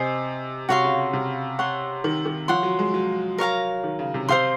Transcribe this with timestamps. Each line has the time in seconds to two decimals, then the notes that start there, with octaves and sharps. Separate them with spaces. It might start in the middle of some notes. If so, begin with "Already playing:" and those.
Already playing: C3 C5 D#5 G#5
0.69 C3 F#4 C#5 F5 C6
0.84 C#3
1.13 C3
1.59 C#5 F#5 C6
2.04 D#3
2.25 D#3
2.48 F3 C#5 F#5 C6
2.63 F#3
2.79 G#3
2.94 F#3
3.38 A#4 C#5 F5 A#5
3.84 D#3
3.99 C#3
4.14 C3
4.29 C3 C5 F5 C6